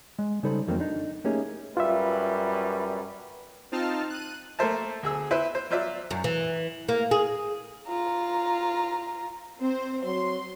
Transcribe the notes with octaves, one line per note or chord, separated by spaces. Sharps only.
G#3
C#3 G3 D#4 A4 C5 B5
F2 D#3 F#3 A3 A#3 C4
D4 D#4
A3 A#3 C#4 D#4 G4 G#4
F#2 G3 F4 B4 E5
C4 D#4 F4 A5 F6
F#6 D#7
A3 A#3 A#4 C5 E5 A5
D2 G#4 E6
E4 B4 C5 E5
C5
F#3 F4 C5 D5 E5
F#2
E3
A#3
G#4
F4 A#5
C4 C5
F#3 C6